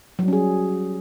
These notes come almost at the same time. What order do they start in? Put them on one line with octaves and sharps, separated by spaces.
F#3 G3 C#4 G#4 F#4